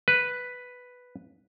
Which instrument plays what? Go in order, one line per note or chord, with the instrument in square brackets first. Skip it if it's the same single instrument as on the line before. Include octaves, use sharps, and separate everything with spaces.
[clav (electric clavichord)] B4